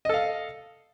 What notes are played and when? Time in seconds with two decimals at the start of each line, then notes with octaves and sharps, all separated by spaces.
0.05 D#5
0.09 A4
0.14 F5